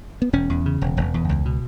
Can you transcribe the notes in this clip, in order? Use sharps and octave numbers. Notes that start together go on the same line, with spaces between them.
B3
E1 C#4
E2
C#3
E1
E1
E2
C#2
B2